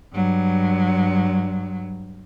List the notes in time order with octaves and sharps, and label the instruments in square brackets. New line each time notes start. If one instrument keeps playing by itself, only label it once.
[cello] G2 F#3